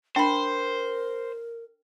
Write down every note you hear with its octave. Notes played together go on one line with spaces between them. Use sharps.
D4 A#4 C5 G5 B5